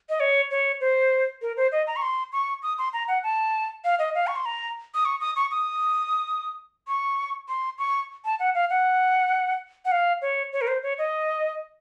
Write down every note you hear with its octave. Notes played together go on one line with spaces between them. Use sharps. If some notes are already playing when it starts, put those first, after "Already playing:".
D#5
C#5
C#5
C5
A#4
C5
D#5
A#5
C#6
C6
C#6
D#6
C6
A#5
F#5
A5
F5
D#5
F5
C#6
C6
A#5
D#6
C#6
D#6
C#6
D#6
C#6
C6
C#6
A5
F#5
F5
F#5
F#5
F5
C#5
C#5
A#4
C5
C#5
D#5